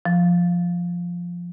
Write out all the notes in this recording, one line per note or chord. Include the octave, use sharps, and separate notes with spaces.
F3